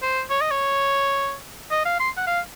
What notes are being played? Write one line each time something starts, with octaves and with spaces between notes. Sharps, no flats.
C5
C#5
D#5
C#5
D#5
F5
C6
F#5
F5